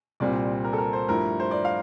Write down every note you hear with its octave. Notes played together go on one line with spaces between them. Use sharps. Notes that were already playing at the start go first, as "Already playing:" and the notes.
C2 A#2 G3 C4 D5
A#4
A4
A#4
C5
G2 F3 A3 E4 A#4
C5
D5
F5